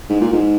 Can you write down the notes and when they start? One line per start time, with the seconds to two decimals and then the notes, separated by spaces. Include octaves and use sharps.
0.10 G#2
0.21 A#2
0.32 G#2